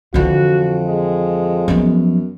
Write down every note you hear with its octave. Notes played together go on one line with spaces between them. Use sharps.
F2 D3 E3 F#4
G#3
F#2 F3 B3